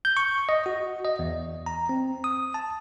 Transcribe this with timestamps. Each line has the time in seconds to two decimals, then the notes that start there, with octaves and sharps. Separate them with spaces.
0.05 G6
0.17 C#6
0.49 D#5
0.66 F#4
1.05 D#5
1.19 E2
1.66 A#5
1.89 C4
2.24 D#6
2.54 A5